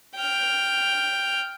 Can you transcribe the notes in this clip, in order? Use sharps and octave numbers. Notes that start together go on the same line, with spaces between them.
G5 F6